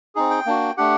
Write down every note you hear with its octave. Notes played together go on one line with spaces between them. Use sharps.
C4 D#4 G#4
G5
A#3 D4 F#4
A3 D4 G4 F#5